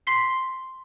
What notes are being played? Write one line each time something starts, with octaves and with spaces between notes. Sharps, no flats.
C6 B6 C7